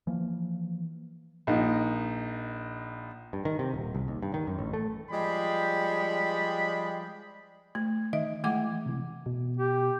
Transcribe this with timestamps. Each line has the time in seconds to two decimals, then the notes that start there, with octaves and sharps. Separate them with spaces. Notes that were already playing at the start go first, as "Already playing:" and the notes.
0.07 E3 F3 A#3
1.47 A#1 D#4
3.33 G2
3.45 D#3
3.59 C3
3.74 D#1
3.94 C2
4.08 D#2
4.22 G2
4.34 D#3
4.47 F#2
4.59 A1
4.73 A3
5.11 F3 G3 G#3 D5 G5 B5
7.75 A3
8.13 D#3 D#5 E5
8.44 E3 G#3 A3 F#5 D6
8.86 C3 E3
9.26 B2
9.57 G4